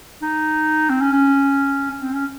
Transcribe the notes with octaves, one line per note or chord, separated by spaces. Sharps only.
D#4
C4
C#4
C#4
C#4
C4
C#4